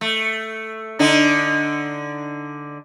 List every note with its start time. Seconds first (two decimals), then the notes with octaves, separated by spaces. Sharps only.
0.01 A3
0.99 D3 D4 D#4